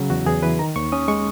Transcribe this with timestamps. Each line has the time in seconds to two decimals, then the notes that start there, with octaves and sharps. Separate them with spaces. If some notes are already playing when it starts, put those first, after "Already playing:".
Already playing: C#3 F#3
0.10 E2 F#4
0.26 E2 G#4
0.43 E3 B4
0.59 D#3 A#5
0.76 D#2 C#6
0.92 C#4 D#6
1.08 G#3 C#6